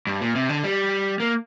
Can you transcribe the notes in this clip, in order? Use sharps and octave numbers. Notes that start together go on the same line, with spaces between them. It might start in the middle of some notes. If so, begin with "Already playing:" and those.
G2
A#2
C3
D3
G3
A#3